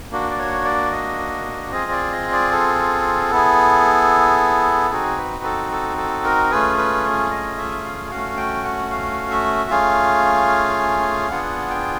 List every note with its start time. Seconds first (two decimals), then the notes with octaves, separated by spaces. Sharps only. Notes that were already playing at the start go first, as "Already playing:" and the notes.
0.11 A#3 D4 F#4
0.31 D5
0.39 C#5
0.65 D5
0.92 D#5
1.71 C4 F4 G#4 D#5
1.91 D5
2.12 D#5
2.32 D5
2.52 A4
3.31 B3 E4 G#4
4.91 C4 D#4 F#4 G#4
5.17 B4
5.44 A4
5.71 A4
5.98 A4
6.24 A#4
6.51 A3 C#4 F4 G#4 B4
6.78 B4
7.31 D#5
7.58 E5
7.84 F5
8.10 A3 C#4 F#4 F5
8.37 G5
8.64 F#5
8.91 F5
9.31 E5
9.70 A3 C#4 F4 G#4 F5
11.30 B3 D4 F4 G#4 F#5
11.70 G5